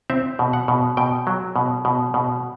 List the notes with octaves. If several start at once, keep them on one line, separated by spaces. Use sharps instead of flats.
C4 E5
B2
F#5
B2
B2 G5
F#3
B2
B2
B2